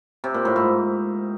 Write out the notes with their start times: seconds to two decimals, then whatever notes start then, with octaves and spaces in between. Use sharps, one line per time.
0.24 C3
0.34 A#2
0.45 A2
0.56 G#2